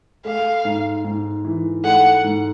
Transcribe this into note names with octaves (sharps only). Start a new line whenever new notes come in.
A3 F5
G#2
G#2
E3
A3 F#5
G#2